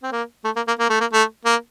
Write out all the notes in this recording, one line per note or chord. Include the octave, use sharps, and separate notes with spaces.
C4
A#3
A3
A#3
A#3
A#3
A3
A#3
A3
A#3